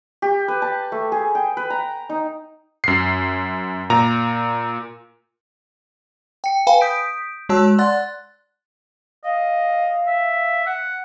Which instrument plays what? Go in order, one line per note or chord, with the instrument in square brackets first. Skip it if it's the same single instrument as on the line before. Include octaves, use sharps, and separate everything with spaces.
[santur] G4
B4
A5
A3
G#4
G5
B4
A#5
D#4
[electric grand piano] F#2 C7
A#2 A#5
[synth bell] G5 C#7
B4 F5 G5 G#5 B5
D#6 G6 B6 D7
G#3 F#4 C#5 A5 E6
D5 F#5 C6 F#6 A6
[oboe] D#5 [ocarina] F5
[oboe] E5
F#5